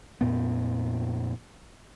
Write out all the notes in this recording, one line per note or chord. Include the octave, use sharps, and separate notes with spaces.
F2 A#2 B3